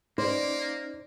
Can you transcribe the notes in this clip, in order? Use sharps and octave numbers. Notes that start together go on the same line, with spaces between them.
A#3 C#4 D#4 C5 D5